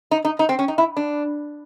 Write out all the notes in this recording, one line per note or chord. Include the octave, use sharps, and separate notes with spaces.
D#4
D#4
D#4
C4
C#4
D#4
E4
D4